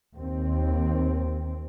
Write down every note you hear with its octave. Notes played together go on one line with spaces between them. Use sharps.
D#2 C4